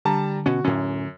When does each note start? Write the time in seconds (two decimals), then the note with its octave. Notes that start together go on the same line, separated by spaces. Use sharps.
0.05 D3 G3 A5 A#5
0.46 B2 C#4 F#4
0.64 F#2 A2 C#4